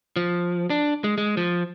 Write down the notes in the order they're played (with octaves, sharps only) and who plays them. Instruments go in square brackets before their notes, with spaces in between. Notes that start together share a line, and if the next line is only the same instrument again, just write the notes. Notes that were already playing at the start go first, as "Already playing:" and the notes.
[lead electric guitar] F3
D4
G#3
G#3
F3